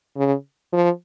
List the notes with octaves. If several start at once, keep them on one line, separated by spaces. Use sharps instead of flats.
C#3
F3